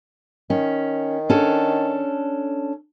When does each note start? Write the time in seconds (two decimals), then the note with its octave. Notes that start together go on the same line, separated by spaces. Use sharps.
0.50 D#3 C#4
1.30 C#4 D4 A4